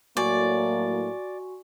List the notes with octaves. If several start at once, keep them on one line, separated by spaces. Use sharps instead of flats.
A2 F#3 A#3 F#4 D5 G#5 C#6